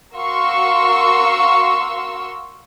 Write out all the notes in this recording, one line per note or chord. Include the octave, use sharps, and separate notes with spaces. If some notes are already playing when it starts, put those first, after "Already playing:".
F#4 A#4 F5 C6 C#6 E6